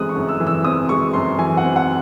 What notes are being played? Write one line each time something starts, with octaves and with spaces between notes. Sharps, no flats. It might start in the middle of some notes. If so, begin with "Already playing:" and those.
Already playing: F#2 E3 G#3 C4 D#6 F#6
C#6
F#2
E6
E3
E6
C4 D#6
G#3 C#6
F#2 C6
E3 G#5
F#5
C4
F#5